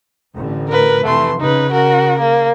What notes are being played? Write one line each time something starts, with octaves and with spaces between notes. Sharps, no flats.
A1 A2 D3
A#4 B4
F1 E3 A3 C6
C#3 D#4 B4
F#4 A#4
A#3